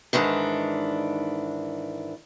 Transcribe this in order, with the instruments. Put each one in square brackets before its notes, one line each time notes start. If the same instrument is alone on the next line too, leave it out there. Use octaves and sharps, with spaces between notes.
[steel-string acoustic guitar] G#2 D#3 E3 D4